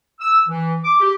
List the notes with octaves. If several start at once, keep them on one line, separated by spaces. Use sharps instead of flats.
E6
E3
D6
G4